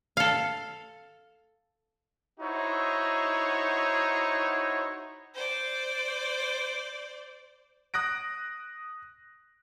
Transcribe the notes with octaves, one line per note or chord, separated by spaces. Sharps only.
A4 F5
D#4 E4 F#4 C5 C#5
C5 D5
D#6 F#6 A#6 D7